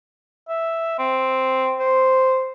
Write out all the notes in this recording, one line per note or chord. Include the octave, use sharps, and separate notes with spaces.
E5
C4
C5